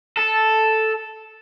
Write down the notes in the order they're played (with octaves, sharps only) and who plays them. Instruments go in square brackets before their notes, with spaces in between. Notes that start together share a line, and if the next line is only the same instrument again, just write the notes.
[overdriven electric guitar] A4